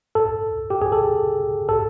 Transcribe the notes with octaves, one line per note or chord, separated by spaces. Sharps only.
A4
G4
G#4
A4
A4